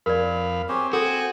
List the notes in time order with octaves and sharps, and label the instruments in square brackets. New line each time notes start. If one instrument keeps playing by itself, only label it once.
[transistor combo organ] F2 F5 B5 [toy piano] A#4 D5
[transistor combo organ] C4 [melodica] G4 G#4 C#5
[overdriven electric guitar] F#4 [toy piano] A4 [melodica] G5 G#5